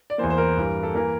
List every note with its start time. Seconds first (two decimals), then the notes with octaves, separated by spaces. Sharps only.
0.10 D5
0.18 E2 E3 A#3 C5
0.30 C5
0.38 A#4
0.57 G2 E3 G3
0.83 A4
0.94 E3 A#3 A#4